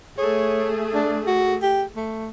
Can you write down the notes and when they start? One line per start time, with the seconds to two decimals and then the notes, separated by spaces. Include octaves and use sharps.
0.18 A3 G#4 C#5
0.94 D4
1.27 F#4
1.62 G4
1.96 A3